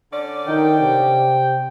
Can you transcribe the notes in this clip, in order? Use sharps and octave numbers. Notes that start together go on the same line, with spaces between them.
D3 C#4 D5
D#3 G5
C3